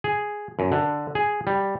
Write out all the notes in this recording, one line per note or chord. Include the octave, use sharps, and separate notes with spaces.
G#4
F#2
D3
G#4
G3